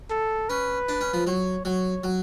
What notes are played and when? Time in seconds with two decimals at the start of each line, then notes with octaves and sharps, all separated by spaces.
0.10 A4
0.49 C#4 B4
0.89 D4
1.01 C#4
1.13 F3
1.27 F#3 C#5
1.65 F#3 C#5
2.04 F#3